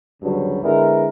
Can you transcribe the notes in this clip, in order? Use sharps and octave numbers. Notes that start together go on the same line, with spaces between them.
D2 G2 C#3 F#3 G3
D3 G#3 B3 E4 A#4